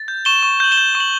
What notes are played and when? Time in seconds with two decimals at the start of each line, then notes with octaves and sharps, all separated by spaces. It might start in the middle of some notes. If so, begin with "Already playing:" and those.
Already playing: A6
0.08 G6
0.25 C#6 E7 G7
0.43 C#6
0.60 G6 F#7
0.72 E7 G7
0.78 G6
0.95 C#6
1.00 F#7